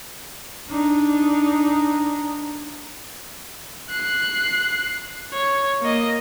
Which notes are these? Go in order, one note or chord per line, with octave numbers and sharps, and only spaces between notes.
D4 D#4
F#6 C7
C#5
A#3 D#5